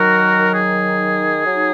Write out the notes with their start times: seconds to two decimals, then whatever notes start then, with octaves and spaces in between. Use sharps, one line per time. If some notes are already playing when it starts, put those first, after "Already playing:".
Already playing: D#3 F#3 D#4 F#4 A#4
0.55 G#4
1.46 F#3 D#4